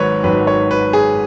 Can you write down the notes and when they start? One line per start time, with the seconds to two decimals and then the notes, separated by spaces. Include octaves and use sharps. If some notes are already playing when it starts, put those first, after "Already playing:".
Already playing: G#1 G#2 D#3 F#3 B4 C#5
0.23 G#1 G#2 D#3 F#3 B4
0.47 C#5
0.71 B4
0.93 G#4